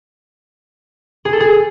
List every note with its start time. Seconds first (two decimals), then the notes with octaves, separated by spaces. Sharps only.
1.25 G#4
1.33 A4
1.40 G#4